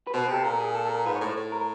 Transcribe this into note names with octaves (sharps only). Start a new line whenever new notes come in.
B4
B2 C5
C3 A4
A#2 A#4
G#4
A4
A4
A#4
G#2 B4
C#5
A2
C5
A2
A#4